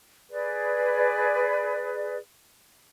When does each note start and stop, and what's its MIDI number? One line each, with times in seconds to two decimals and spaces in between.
0.31 2.18 68
0.31 2.18 71
0.31 2.18 74